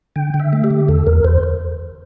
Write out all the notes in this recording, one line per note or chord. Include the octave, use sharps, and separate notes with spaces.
D3 G5
D3
E5
A3
G4
D3
E2 A4
E2 A#4
E2 C5